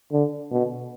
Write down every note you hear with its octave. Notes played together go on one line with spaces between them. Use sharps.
D3
B2